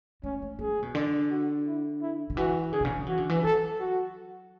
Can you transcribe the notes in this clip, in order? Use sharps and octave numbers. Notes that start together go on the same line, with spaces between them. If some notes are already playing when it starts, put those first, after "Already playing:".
A3 C#4
A3
A3 G#4
C#3
B2
D3
F#4
E4
E4
D3
E3 F#4
D3 G#4
B2
C#3
F#3
E3 F#4
D3
E3
F#3 A4
F#4